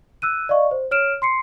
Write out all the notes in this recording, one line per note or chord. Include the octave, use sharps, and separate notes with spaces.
E6 F#6 D#7
D5 D#5 F5 C#6
C5
C#5 F6 D7 E7
C6 C7 C#7